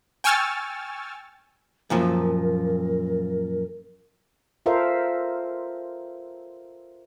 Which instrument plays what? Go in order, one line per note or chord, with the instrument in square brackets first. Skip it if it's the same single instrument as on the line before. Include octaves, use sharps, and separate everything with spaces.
[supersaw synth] G5 G#5 C#6 E6 F6 A6
[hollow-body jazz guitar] F#2 A#2 F3 [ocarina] A#4
[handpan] F4 A4 A#4 C5 E5 F5